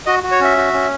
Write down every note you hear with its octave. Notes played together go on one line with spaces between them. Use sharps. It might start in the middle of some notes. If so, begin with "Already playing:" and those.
F#4 D#5
F#4
C#5
C#4 E5
F#4
C#4